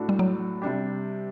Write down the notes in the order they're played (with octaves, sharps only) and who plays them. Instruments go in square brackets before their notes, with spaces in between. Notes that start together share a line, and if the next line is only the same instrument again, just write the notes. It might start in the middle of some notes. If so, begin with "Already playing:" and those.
Already playing: [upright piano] A2 A3 D4 F#4 A4
[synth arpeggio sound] G3
F#3
[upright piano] C3 G3 D4 G4